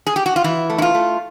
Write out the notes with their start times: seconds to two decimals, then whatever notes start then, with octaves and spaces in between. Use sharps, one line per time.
0.07 G#4
0.16 G4
0.26 F#4
0.36 F4
0.44 E3 E4
0.70 A3
0.78 E4
0.82 F4
0.95 A3